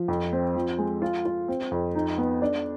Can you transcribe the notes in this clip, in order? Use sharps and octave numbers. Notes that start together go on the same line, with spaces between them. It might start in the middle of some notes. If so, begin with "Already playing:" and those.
Already playing: F3
F2
C4
F3
G#3
F4
F4
C4
F2
D#4
B3
D4